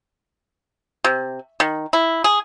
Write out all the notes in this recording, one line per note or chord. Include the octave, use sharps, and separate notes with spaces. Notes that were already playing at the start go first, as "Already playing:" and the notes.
C3
D#3
E4
G#4